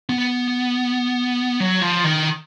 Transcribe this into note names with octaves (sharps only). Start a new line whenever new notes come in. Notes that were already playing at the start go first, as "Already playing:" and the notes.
B3
F#3
F3
D#3